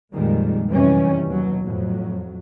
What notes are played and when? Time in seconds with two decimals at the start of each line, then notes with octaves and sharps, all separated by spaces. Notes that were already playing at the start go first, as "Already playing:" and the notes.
0.13 F2 A#2 D#3 G3 G#3
0.70 F#2 C3 D#3 E3 G3 C#4
1.26 D#2 B2 F#3
1.64 F2 A2 F#3